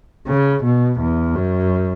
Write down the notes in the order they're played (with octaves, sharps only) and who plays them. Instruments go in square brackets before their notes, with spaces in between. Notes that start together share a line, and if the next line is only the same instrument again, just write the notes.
[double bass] C#3
B2
E2
F#2